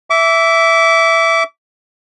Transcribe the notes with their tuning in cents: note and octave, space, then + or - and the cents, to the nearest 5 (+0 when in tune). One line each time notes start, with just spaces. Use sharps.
E5 +0 D6 -30